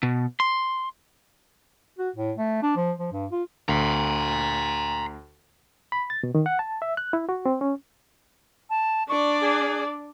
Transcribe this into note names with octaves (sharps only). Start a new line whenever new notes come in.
B2
C6
F#4
A2
A3
D4
F3
F3
G2
F4
D2 A#5 C6
B5
A6
B2
D#3
F#5
A5
E5
F#6
E4
F#4
C4
C#4
A5
D4 D5 C#6
G#4